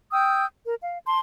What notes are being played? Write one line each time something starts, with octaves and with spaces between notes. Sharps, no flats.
G5 D#6 E6 G6
A#4
F5
A5 C6